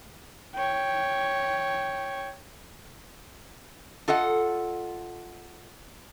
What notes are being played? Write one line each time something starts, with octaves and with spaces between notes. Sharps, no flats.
C#5 G5
F4 A4 D#5 F#5